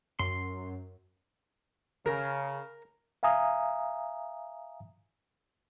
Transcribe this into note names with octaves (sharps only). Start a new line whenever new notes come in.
F#2 C6
C#3 A#4
E5 F5 G#5 A#5 D#6